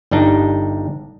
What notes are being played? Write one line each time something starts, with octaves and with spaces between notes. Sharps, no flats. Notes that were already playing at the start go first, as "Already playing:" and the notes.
G1 G3 D4 D#4